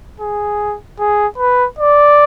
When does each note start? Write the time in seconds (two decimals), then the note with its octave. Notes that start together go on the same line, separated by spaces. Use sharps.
0.20 G#4
0.99 G#4
1.38 B4
1.79 D5